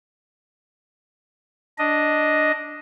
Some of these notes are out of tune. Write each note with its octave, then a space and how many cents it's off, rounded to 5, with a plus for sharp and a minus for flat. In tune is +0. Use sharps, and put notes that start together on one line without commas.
D4 +0 D#5 +0